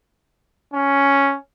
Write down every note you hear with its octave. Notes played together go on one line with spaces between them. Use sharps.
C#4